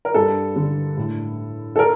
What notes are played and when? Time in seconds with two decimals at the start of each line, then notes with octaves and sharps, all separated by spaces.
0.05 A#4
0.14 G2 A4
0.56 D3
0.97 A2
1.76 A4
1.79 A#4